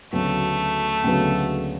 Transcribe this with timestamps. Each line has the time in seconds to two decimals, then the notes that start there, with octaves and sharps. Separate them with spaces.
0.13 D2 C#3 F#3 A3 B3
1.04 D2 C#3 F#3 B3